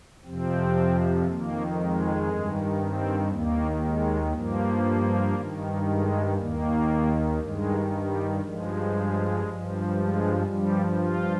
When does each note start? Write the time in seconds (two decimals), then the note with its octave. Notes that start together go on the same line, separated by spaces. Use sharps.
0.25 F2 C3 F3 C4
1.27 F2 D#3 A#3
1.77 G#3
2.29 G2 D#3
2.80 C4
3.31 D#2 D#3 A#3
3.82 G#3
4.33 G2 F3 A#3
5.35 G2 D#3
5.86 G#3
6.37 D#2 D#3 A#3
7.39 G2 D#3 G#3
7.91 G3
8.42 G2 F3 G#3
9.44 G2 F3
9.95 G#3
10.46 G2 F3 G3
10.97 F4